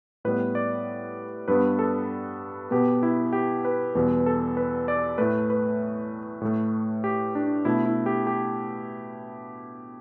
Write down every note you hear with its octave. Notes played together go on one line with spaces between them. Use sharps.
A2 G3 B3 B4
D5
G2 G3 B3 B4
A4
B2 B3 G4
E4
G4
B4
E2 B2 G3 B3 B4
A4
B4
D5
A2 A3 B4
B4
A2 A3
G4
D4
B2 A3 E4
E4
G4
G4